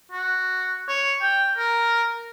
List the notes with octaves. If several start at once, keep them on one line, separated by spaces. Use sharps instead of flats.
F#4
C#5
G5
A#4